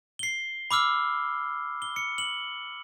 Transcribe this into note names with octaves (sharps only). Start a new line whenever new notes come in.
C7 G7
B5 D6 E6 F6
G7
C#7
F#7